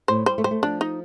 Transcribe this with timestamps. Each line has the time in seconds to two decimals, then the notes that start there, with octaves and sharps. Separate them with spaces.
0.08 A2 C5
0.26 G3 C5
0.38 A3
0.44 G3 C5
0.51 A3
0.63 F3 D4
0.81 D#4